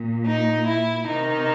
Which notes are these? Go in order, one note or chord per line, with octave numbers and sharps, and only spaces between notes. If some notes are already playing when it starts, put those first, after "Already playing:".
Already playing: A#2
D#4
E4
C3 D#3 D#4